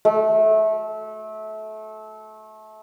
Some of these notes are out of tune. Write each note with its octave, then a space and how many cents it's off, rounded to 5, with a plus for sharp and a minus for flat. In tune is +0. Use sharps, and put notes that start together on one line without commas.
A3 -25